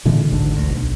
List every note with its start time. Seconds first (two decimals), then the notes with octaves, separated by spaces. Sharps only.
0.05 A#2 D3 E3 G#3
0.31 G#1 D2 G#2 D3
0.57 D2
0.70 B1